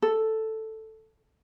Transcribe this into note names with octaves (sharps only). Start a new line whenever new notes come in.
A4